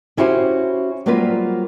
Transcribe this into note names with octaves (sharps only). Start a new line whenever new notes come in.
C#4 E4 F#4 G4 C5
F#3 G3 A#3 C4 F4 B4